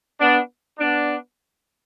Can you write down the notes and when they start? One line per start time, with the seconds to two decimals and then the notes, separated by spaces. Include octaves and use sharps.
0.20 B3 D4
0.79 B3 D4